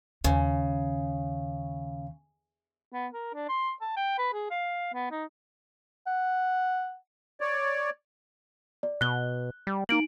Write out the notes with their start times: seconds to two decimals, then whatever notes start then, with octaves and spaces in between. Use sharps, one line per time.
0.24 D#2 C#3
2.93 B3
3.13 A#4
3.34 D4
3.49 C6
3.81 A5
3.97 G5
4.19 B4
4.34 G#4
4.51 F5
4.94 B3
5.11 D#4
6.06 F#5
7.41 C#5 D5
8.83 D5
9.01 B2 F#6 G7
9.67 G3
9.89 A#3 D#4 D7 F#7